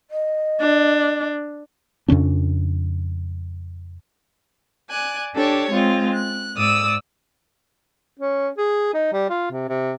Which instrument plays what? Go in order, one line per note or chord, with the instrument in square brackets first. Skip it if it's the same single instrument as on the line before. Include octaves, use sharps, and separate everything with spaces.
[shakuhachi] D#5
[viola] D4
[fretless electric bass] F2 C#3 C#4 D4
[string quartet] D5 G#5 F#6
D4 G4 A4 C#5
G#3 C4 F4
F#6
G#2 D5 D#6 E6
[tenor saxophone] C#4
G#4
D#4
G3
F4
C3
C3